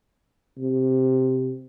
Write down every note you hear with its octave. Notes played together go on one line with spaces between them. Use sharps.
C3